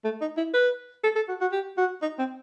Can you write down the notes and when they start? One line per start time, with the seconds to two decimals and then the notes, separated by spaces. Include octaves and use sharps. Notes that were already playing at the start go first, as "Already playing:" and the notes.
0.05 A3
0.21 D#4
0.37 E4
0.54 B4
1.04 A4
1.16 A4
1.29 F#4
1.41 F#4
1.52 G4
1.78 F#4
2.02 D#4
2.19 C4